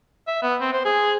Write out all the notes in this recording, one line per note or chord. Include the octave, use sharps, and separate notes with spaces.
E5
B3
C4
C5
G#4